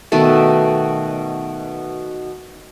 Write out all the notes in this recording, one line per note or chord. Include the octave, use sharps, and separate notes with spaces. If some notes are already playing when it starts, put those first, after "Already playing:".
B2 D#3 A3 A5